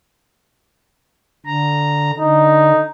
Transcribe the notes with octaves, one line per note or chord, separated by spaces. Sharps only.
D3 A#5
D3 D#4